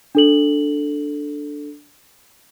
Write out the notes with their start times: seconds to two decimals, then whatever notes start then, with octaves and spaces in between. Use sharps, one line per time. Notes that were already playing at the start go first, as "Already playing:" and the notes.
0.15 D4 A4 F#7